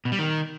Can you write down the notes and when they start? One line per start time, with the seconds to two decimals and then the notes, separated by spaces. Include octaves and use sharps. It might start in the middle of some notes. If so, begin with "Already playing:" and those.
0.05 B2
0.12 G3
0.19 D#3